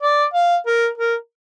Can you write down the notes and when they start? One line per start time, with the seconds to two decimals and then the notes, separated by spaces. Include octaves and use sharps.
0.02 D5
0.34 F5
0.66 A#4
0.98 A#4